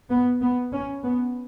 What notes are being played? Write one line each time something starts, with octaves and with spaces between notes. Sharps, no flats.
B3
B3
C#4
B3